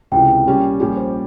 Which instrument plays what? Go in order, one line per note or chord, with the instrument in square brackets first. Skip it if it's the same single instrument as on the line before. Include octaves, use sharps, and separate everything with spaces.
[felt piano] C#2 C3 E3 [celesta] G5
[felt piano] A#2 G3 C#4
A#1 A#2 G3 C#4 G4
[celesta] C5